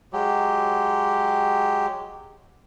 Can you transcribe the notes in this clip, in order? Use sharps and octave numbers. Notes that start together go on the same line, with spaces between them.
F#3 G#3 G4